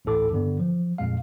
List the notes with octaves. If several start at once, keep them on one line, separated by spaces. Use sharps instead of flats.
A1 D2 A2 A4 D6
G2 D3 B3
F3
F2 A#2 G#3 F5